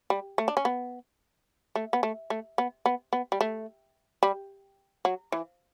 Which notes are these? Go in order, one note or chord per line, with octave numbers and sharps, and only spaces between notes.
G3
A3
D4
C#4
B3
A3
B3
A3
A3
B3
B3
B3
G3
A3
G3
F#3
E3